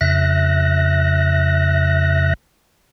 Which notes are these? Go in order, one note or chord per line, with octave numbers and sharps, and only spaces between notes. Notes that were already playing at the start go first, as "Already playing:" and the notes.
F2 C#3 E5 F#6 A#6